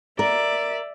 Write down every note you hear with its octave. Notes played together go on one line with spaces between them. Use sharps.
A#4 D5 E5